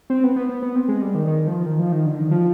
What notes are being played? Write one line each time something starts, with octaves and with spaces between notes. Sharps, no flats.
C4
B3
B3
B3
B3
C4
G#3
G3
D#3
D#3
F3
D#3
F3
D#3
D3
D#3
F3